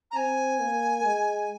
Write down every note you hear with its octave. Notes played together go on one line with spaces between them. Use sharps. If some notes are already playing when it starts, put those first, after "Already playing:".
A#5
C4 G#5
A#3
G#3